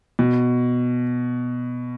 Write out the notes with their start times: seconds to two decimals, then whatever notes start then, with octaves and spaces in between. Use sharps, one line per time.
0.19 B2